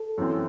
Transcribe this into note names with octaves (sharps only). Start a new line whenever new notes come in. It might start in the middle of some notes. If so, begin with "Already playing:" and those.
Already playing: A4
F#2 E3 C4